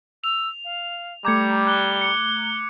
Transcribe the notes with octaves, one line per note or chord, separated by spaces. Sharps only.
E6 F7
F5
G3 A3 A#5 D6 G6 G#6 C#7
F#6 G7
C#7